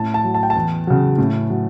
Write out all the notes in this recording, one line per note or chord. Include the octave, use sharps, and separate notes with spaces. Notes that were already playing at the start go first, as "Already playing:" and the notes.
Already playing: A2 A5
A5
F#3
A5
G5
A5
E2
C#3 F#3
A2
F#3